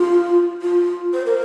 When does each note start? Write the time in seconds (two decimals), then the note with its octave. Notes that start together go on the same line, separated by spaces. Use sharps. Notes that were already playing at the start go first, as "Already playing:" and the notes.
Already playing: F4
0.62 F4
1.13 C5
1.26 A#4